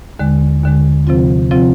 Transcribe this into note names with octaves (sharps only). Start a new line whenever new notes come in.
D#2 D3 G#3
D#2 D3 G#3
C3 F3 C4 F4
C3 F3 C4 F4